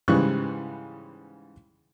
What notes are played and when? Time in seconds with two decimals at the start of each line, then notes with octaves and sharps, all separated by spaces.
0.08 G#2 C#3 E3 G3 C#6 F#6